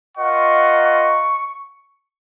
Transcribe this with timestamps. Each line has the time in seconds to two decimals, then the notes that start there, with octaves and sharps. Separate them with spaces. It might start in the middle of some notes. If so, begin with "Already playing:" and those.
0.17 F4 A#4 D#5 F#5 C#6
0.85 C#6